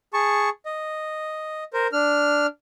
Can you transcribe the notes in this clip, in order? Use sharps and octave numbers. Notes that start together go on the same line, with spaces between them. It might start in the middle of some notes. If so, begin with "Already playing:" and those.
G#4 A5 C#6
D#5
A#4 C5
D4 F6